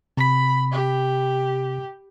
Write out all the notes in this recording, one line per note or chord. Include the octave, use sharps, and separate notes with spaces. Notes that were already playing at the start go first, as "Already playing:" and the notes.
C3 B5 B6
G4